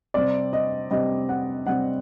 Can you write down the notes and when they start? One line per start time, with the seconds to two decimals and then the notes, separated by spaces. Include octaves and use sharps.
0.14 C3 G3 C4 D5
0.53 D#5
0.91 C3 G3 C4 D#5
1.29 F#5
1.66 C3 G3 C4 F#5